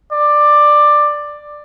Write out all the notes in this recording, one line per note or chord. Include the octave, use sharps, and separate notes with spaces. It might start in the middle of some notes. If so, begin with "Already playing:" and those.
D5